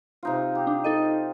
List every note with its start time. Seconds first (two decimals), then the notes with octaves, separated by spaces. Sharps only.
0.23 C3 D#4 F4
0.55 G4
0.67 D4
0.84 D#4 A4 D#5